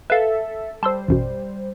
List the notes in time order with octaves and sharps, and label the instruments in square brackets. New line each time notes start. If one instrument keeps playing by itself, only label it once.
[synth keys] A4 E5 [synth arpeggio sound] B4 F5
[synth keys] G3 C5 [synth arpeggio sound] A5 C6 E6
[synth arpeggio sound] A1 F#2 B2